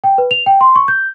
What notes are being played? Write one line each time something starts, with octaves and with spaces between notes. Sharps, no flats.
G5
B4
F7
G5
C6
C#6
G6